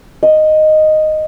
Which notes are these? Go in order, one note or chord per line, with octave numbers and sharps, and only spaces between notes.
D#5